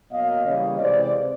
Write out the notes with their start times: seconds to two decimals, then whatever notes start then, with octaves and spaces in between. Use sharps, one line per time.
0.12 B2 F#3 A#3 D#5 F5
0.45 C#3 E3 G3 A#3 C#5 D#5
0.80 C3 E3 G#3 C4 C5 D5